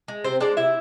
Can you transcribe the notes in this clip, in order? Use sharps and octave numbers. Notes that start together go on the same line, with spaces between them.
G#3
C3 C4 C5
G#3 D4 D5
C3 E4 E5